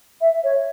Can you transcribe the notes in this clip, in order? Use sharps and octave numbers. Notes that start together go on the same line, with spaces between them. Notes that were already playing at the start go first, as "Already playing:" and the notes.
E5
C#5